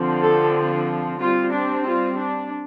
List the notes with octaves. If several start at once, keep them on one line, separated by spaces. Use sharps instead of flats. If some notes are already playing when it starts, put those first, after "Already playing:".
Already playing: D3 F3 C4
A4
G3 C4 F4
D4
F4
D4